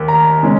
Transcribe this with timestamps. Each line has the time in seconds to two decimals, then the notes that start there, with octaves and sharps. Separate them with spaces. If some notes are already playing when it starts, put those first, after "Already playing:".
Already playing: D#2 D#3
0.08 A#5
0.43 C#3 G#3 C#4